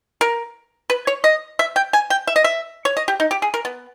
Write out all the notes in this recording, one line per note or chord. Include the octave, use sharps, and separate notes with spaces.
A#4
B4
C#5
D#5
E5
G5
G#5
G5
E5
D#5
E5
C#5
D#5
G4
D#4
G4
G#4
A#4
B3